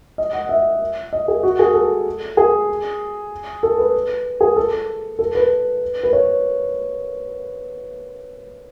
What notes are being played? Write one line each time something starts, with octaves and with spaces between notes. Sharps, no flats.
D#5
F#5
E5
D#5
G#4
F#4
G#4
A4
G#4
A4
B4
G#4
A4
A4
B4
B4
C#5